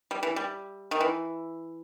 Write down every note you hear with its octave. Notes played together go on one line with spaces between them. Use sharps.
G3
E3
G3
D#3
E3